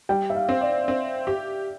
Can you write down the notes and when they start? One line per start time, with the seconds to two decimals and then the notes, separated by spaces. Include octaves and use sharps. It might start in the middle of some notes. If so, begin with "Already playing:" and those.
0.09 G3 G5
0.30 E5
0.35 F5
0.49 C4
0.61 D5
0.88 C4
1.27 G4